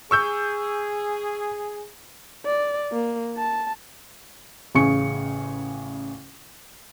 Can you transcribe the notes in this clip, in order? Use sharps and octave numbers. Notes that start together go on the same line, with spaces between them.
G#4 C#6 E6 G6
D5
A#3
A5
A1 C#3 G#4 C#6 C#7